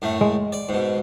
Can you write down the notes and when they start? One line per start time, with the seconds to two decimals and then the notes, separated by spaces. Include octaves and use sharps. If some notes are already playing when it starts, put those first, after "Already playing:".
0.02 F#2 A2 A3
0.21 G#3
0.52 D5
0.69 G#2 B2